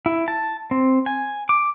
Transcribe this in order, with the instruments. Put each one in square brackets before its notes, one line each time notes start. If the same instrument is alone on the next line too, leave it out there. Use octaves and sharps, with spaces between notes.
[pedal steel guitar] E4
A5
C4
G#5
D6